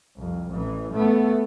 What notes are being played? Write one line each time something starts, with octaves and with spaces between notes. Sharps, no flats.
C2 F2
A1 E3
A3 B3